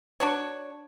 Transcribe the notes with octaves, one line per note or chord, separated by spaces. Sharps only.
D4 F#4 C#5